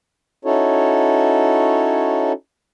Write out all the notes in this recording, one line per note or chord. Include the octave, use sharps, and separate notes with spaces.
C#4 D#4 E4 F#4 A4 C#5